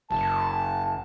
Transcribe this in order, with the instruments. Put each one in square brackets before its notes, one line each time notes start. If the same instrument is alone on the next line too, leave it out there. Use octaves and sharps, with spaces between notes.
[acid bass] F#1 [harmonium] A5